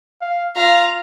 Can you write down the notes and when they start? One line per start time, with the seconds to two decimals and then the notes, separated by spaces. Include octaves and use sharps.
0.21 F5
0.56 F4 F5 A#5